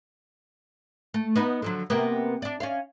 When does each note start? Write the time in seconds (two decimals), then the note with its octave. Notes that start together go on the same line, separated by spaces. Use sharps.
1.14 A3
1.36 B3 D#4 B4
1.62 D3 F3 F#3
1.90 C3 A#3 B3
2.42 D4 D5
2.60 C#4 D5 F5